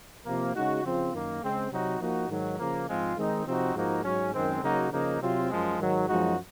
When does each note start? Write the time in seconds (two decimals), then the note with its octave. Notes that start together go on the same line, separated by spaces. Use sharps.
0.25 C3 F3 A#3
0.54 C#3 G#3 D#4 F#4
0.83 C#3 F3 C4 F4
1.13 F#2 D#3 A#3
1.42 C#3 G#3 C4
1.70 C3 F#3 C4 D#4 F#4
2.00 F3 A#3 D#4 F#4
2.29 G#2 D#3 F#3
2.58 C#3 F3 A#3
2.88 G#2 F3 G#3 C4 F4
3.17 D#3 G#3 C4 D#4
3.46 C3 F3 C4 D#4 F#4
3.75 G#2 F3 A#3 D#4 F#4
4.04 G#2 F#3 C#4
4.33 F#2 D#3 G#3 C4
4.62 C#3 F#3 A#3 D#4 F#4
4.91 C#3 F3 A#3 D#4
5.21 C3 F#3 C4 F4
5.50 F#2 F3 G#3
5.78 G#2 D#3 F#3
6.08 F#2 F3 G#3 D#4 F#4